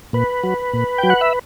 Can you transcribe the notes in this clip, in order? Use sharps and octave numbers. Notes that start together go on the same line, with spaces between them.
A#2 B4
F#3
A#2
F#3 G5
F#5
E5